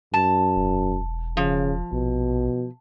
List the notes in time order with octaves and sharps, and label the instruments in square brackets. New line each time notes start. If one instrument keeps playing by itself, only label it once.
[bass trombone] F#2 [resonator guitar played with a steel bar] A5
[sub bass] E1
[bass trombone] C#3 [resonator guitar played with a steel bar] F3
[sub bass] A#1 [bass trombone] B2